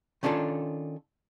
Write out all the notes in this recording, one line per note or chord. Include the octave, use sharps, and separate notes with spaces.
D#3 C#4 D4 F4 A4